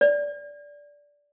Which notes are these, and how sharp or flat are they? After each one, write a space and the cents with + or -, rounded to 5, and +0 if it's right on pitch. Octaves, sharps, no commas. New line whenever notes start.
D5 -15